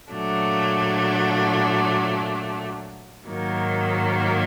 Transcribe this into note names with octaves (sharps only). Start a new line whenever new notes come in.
A#2 F#3 A3 D4
G#2 D#3 F#3 A#3